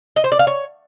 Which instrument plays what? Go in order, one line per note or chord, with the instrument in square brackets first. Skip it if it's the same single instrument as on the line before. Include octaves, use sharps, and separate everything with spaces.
[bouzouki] D#5
C5
D5
F5
C#5